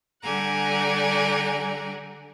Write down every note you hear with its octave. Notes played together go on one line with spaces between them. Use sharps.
D3 G3 G4 F#5 G#5 A#5